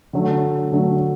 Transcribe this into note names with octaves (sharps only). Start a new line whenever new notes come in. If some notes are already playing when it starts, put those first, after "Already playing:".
D3 F#3 A3
D3 F#3 A3